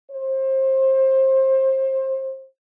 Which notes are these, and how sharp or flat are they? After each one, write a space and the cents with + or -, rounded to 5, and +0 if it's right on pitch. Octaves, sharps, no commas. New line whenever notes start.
C5 +25